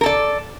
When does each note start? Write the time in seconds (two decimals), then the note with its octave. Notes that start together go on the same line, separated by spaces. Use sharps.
0.01 A#4
0.03 A4
0.06 D5